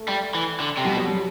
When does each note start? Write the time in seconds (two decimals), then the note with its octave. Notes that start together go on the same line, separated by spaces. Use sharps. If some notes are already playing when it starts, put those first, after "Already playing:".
Already playing: A3
0.08 G3
0.35 E3
0.60 D3
0.77 C3
0.85 B2 G3
0.97 F#3
1.08 G3